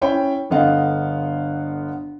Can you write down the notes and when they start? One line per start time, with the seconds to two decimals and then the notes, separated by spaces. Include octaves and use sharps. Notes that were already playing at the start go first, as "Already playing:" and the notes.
0.01 C#4 E4 C#5 G5 B5
0.50 G1 D3 B3 D#5 F5 F#5